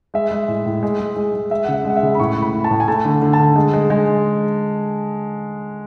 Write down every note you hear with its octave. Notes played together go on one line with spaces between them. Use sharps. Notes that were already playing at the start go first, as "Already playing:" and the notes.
G#3 E5
G#3
A2
A2
G#3
G#3
G#3
G#3
G#3 E5
C#3 F#5
E5
G#3 F#5
E5
C#3
B5
A2 C#6
A2
B5
A2
A5
A2
G#5
A3 A5
D3
D3
A5
D3
G#3
G#3
G#3